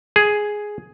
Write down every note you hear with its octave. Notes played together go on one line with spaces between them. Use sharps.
G#4